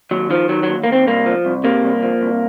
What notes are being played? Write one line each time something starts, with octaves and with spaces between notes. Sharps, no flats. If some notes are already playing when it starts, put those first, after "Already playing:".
D#2 F#3
D#3 F3
D#3 F#3
F#3
D#2
A#3
D#2 C4
C2 A#3
F3
C2
C3 A#3
C2
F3
C2